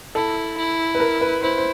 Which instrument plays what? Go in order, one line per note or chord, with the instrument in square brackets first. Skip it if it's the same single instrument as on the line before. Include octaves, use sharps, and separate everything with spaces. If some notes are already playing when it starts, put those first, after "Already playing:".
[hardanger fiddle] E4 [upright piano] A4
[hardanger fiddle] E4
[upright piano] B4
A#4
B4
[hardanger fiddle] E4 [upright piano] C5
[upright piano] C5